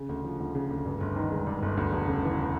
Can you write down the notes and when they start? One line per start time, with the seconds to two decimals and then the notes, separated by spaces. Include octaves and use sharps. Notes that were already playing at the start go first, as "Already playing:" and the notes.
Already playing: C#3
0.09 D2
0.25 F3
0.40 D2
0.55 C#3
0.70 D2
0.85 G2
1.00 G1
1.16 D#3
1.31 G#3
1.47 G2
1.62 G1
1.77 D2
1.92 E1
2.08 C#3
2.23 E3